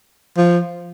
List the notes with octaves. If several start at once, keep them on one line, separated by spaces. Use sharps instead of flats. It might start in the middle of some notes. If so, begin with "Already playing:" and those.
F3